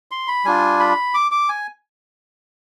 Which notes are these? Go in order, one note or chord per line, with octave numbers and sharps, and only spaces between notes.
C6
B5
G3 D4 F4 G#5
B5
D6
D6
G#5